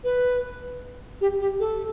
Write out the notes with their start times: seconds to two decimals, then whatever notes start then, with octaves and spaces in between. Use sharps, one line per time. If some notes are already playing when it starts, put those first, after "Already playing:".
0.04 B4
1.21 G4
1.40 G4
1.60 A4